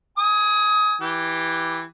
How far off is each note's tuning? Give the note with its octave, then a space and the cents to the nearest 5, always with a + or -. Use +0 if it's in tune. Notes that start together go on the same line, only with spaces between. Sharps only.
G#5 +0 D#6 +25
E3 +0 G4 +0